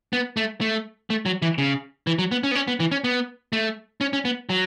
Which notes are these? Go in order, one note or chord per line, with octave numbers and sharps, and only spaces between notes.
B3
A3
A3
A3
F#3
E3
C#3
E3
F#3
B3
C#4
B3
C#4
B3
E3
C#4
B3
A3
C#4
C#4
B3
F#3